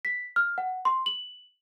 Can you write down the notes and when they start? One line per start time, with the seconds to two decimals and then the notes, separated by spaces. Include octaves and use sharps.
0.05 B6
0.36 F6
0.58 F#5
0.85 C6
1.06 F#7